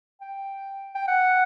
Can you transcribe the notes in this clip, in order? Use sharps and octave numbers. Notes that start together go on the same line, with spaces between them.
G5
G5
F#5